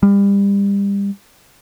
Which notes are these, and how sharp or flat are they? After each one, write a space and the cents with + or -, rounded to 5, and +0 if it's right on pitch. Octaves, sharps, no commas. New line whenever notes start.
G3 +30